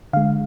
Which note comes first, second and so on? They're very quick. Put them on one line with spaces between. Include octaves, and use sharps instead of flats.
D3 F5 G#3